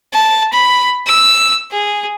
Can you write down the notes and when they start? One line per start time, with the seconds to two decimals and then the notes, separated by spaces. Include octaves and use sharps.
0.13 A5
0.53 B5
1.07 E6
1.72 G#4